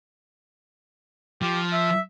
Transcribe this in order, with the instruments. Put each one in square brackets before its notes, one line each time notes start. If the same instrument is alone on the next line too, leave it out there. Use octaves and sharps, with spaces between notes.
[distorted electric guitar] F3 [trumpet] G4
[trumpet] E5